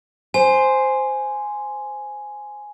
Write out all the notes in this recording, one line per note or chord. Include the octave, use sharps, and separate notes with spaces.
C5 G#5